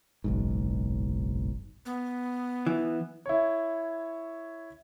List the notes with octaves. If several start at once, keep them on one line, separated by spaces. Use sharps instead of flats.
F#1 B1 G#2
B3
E3
E4 C#5